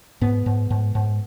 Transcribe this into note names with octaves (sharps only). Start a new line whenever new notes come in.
G#2 B3
G#2
G#2
G#2